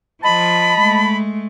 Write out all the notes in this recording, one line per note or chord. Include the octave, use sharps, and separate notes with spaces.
F3 D#5 A5 B5
G#3 A3